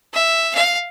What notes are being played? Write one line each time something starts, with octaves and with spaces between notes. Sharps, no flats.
E5
F5